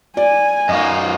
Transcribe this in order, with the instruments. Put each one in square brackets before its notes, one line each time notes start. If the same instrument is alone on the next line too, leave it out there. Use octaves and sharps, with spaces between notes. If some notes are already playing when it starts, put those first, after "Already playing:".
[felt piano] D5 [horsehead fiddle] G#5
[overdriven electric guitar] F#2 D#4 [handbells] D#5 F5